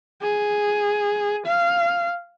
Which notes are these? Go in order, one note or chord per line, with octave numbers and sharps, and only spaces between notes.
G#4
F5